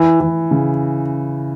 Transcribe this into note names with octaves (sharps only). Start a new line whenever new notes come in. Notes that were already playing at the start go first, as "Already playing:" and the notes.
Already playing: E3
E3
C#3